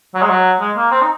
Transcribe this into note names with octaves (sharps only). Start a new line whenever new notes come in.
F#3
G#3
F#3
G#3
A#3
C4
D#4